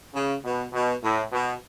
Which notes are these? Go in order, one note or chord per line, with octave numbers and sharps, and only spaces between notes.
C#3
B2
B2
A2
B2